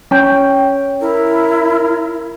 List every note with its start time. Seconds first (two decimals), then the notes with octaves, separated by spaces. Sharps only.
0.11 C#4 G5
1.01 E4 A#4